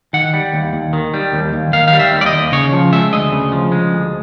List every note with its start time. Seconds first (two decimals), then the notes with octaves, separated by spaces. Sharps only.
0.13 D#3 F#5
0.33 G3
0.53 D#2
0.73 D#2
0.93 D#3
1.14 G3
1.33 D#2
1.53 D#2
1.73 D#3 F5
1.88 F5
1.93 G3
2.00 E5
2.13 D#2
2.21 D5
2.26 D#5
2.33 D#2
2.52 C#3 C#5
2.73 F3
2.92 G#3 E5
3.12 D2 D#5
3.33 C#3
3.52 F3
3.72 G#3
3.92 D2